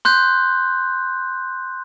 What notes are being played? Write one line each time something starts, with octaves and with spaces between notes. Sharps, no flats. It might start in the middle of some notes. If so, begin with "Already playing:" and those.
C6 F#6 G6